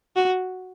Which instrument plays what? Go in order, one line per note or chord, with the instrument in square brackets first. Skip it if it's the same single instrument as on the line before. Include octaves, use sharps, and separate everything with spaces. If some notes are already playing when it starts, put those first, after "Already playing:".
[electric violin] F#4